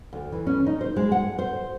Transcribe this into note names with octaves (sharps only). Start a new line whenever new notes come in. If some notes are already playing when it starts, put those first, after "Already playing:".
D2
E3
C#4
D#4
C5
G#3
F#5
C5